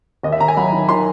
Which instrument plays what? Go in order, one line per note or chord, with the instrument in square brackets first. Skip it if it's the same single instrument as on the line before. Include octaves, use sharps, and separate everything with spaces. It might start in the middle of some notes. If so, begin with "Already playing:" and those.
[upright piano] D#2 D#5
E5
D#2 A#5
G#5
F#3 B5
D#3
D#3 C6